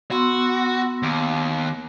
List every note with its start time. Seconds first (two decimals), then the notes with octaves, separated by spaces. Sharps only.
0.11 B3 F#4 C6 E6
1.03 D#2